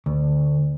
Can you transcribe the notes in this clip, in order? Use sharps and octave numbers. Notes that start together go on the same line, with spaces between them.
D2